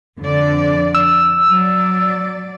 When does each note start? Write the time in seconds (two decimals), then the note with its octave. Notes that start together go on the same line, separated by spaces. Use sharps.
0.20 F2 D3 D5
0.95 E6
1.50 F#3 D5